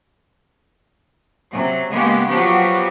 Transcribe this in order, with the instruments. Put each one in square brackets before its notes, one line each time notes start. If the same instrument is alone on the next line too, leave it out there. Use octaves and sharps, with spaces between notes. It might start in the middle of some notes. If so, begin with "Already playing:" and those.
[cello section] C3 F#3
C#3 G#3 A#3 B3 G4
F3 F#3 B3 F#4 G4